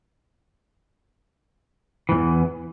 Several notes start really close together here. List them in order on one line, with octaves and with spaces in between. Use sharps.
E3 G#2 E2